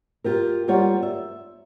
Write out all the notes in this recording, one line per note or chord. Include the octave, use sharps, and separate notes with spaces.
F4 G4 A#4
G3 A#3 F4 C#5 F#5
E5